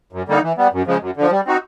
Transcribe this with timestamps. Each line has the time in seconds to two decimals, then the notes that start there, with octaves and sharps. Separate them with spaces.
0.13 F#2
0.28 D3 G3 A#3 D#4
0.43 E3
0.58 G3 B3
0.73 F#2
0.87 C#3 F3 G#3
1.01 F#2
1.17 D3 F3
1.31 G3
1.46 C4 D#4 F#4